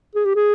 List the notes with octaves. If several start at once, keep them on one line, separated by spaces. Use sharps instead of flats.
G#4
G4
G#4